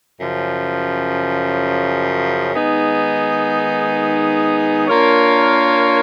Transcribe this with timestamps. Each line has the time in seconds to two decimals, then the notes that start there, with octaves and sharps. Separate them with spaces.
0.20 F#2 C#3 F3
2.54 D#3 G#3 B3 D#4 G#4
4.88 A#3 D4 F4 A#4 C#5